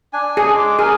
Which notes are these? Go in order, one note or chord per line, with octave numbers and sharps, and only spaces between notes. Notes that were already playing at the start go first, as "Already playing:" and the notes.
D4 G#5
G#4
G#3 D6
G#4 A#4 G#5